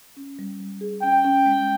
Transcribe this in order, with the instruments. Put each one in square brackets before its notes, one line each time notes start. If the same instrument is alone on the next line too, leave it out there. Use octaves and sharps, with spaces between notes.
[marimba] C#4
G3
G3
G#4
[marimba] C#4 [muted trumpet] G5
[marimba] C#4
G#3